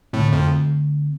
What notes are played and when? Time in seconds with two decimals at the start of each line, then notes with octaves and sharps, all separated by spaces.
0.13 A2 D3 A3 C4
0.32 F2